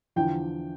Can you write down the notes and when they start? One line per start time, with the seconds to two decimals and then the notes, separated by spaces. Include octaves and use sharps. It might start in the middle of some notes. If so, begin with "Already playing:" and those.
0.16 E2 D3 F3 G5